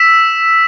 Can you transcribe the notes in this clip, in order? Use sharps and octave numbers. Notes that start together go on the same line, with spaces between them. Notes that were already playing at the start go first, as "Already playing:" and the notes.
Already playing: E6 B6 E7